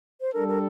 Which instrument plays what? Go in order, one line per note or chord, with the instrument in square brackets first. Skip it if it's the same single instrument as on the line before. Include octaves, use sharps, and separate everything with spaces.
[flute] C5
[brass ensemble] G3 D4 A4 [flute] A#4
[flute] A#4